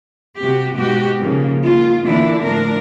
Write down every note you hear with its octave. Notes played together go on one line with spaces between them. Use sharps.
C3 F#4 G4
G#2 B2 F#4 G4
G#2 C#3 F3 A#3
D#2 F4
A#2 D3 E3 A#3 D4 E4
A2 F3 D4 A#4